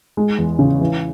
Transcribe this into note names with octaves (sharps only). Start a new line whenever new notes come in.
G#3
E2
C#3
E3